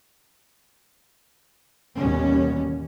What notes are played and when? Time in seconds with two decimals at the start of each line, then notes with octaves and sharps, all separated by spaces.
1.97 A1 D#2 B2 G3 C#4